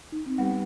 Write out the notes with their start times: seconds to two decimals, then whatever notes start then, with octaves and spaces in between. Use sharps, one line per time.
0.12 D#4
0.26 C4
0.38 G3 B3 G4 B4 F#5